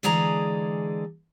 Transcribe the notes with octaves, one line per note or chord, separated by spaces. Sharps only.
D3 E3 G#3 G#4 D5 A#5